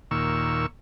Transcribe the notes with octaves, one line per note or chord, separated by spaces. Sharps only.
D#2 A#2 C#6 E6